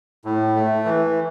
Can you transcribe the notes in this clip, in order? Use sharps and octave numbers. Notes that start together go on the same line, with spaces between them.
A2
A3
E3